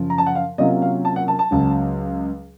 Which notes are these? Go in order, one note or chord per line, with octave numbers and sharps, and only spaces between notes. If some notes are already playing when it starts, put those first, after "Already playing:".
Already playing: F#2 C#3 F3
A#5
A5
F#5
F5
C3 F#3 A#3 C#4 F4 D#5
F5
A5
F#5
A5
A5
C#2 C#3 F#3